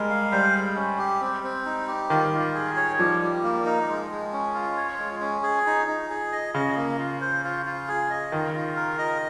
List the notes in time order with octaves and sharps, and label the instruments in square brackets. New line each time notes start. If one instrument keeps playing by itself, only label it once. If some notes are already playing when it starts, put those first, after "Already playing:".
Already playing: [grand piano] G3 G#3 [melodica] A#4
[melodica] F5
[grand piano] G3 [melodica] C5
[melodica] G#3
C#4
G4
C4
C4
D#4
G4
[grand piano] D#3 [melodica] F4
[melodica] F4
G#4
C#5
[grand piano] F3 [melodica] G3
[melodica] G3
A#3
D#4
G#3
G#3
C#4
F4
C#5
G#3
C#4
G#4
D#4
D#4
G#4
D#5
[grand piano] C#3 [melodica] D#5
[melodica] A#3
F4
C5
F4
F4
G#4
D#5
[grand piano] D#3 [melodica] F4
[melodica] F4
A#4
D#5